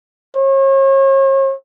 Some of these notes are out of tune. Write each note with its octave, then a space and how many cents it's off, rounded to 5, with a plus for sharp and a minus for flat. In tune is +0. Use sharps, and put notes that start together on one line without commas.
C#5 -40